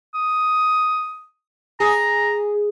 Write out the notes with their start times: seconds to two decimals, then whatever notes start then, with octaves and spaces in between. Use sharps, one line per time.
0.14 D#6
1.80 G#4 A#5